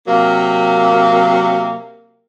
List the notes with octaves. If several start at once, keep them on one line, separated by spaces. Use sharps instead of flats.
C3 F#3 A#3